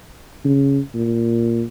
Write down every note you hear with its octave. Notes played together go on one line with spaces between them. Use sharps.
C#3
A#2